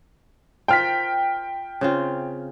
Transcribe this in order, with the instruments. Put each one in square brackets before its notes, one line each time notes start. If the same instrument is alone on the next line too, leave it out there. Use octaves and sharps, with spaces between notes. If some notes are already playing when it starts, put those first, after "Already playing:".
[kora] F4 A#4 C5 [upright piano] G5 F6 B6
[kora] C#3 C4 F4